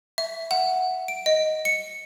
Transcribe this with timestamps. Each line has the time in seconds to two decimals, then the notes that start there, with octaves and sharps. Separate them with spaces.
0.18 E5
0.51 F#5
1.08 D7
1.26 D#5
1.65 C#7